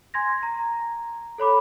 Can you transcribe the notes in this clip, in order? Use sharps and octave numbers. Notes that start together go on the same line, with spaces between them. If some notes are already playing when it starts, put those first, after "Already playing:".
G#5 C6 G#6 A#6
A#5
A4 C#5 B5 D6